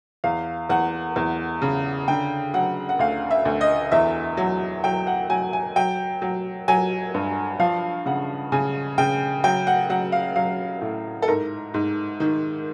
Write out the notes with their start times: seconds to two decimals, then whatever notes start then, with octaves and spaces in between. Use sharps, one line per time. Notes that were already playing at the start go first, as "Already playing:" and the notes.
0.24 E2 F5
0.69 E2 F#5
1.16 E2
1.62 C#3
2.08 D3 G5
2.54 F#3 F#5
2.89 F#5
2.99 D2 F5
3.31 E5
3.45 D2
3.61 D#5
3.92 E2 E5
4.37 F#3
4.84 F#3 G5
5.07 F#5
5.30 F#3 G#5
5.53 G#5
5.76 F#3 G5
6.22 F#3
6.68 F#3 G#5
7.14 G2
7.60 F3 F5
8.06 C#3 F#5
8.52 C#3 G#5
8.98 C#3 G5
9.44 F#3 G5
9.67 F#5
9.90 F#3 F#5
10.12 F5
10.36 F#3 F5
10.81 A2
11.22 A4
11.28 G#2 A#4
11.74 G#2
12.20 D#3